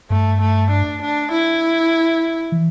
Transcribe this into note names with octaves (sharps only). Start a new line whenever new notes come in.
G2 A3
A3
D4
D4
E4
E3